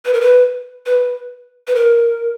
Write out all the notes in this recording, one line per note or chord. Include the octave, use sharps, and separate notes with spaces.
B4
A#4
B4
B4
B4
A#4